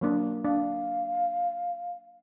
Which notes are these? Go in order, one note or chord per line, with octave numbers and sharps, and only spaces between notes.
F#3 A#3 D4
D4 F5